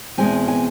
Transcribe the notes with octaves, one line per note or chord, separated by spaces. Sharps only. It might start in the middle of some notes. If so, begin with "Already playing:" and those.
E2 B2 G#3 C4 G#5
G#5